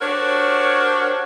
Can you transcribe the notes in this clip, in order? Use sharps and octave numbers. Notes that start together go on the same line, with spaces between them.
D4 F#4 G4 A#4 C5 C#5